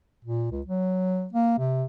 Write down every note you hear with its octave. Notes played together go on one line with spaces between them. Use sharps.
A#2
C#2
F#3
A#3
C3